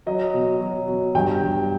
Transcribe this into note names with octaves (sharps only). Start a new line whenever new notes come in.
F#3 D#5
B2
F#3
B2
G2 G5
G2